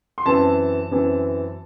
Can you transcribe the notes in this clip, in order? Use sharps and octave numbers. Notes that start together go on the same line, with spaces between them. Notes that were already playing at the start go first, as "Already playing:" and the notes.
C6
F#2 E3 C4 A5
F#2 E3 C4